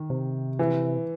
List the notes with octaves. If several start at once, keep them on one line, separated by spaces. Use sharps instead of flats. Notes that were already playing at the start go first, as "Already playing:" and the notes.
Already playing: D#3
C3
E3